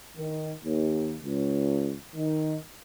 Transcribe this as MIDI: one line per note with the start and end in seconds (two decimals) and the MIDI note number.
0.18 0.52 51
0.64 1.17 39
1.23 1.95 37
2.16 2.56 51